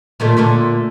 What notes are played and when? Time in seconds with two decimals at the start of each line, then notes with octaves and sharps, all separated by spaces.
0.20 A#2 D#3 A3
0.37 A#2 D3 A3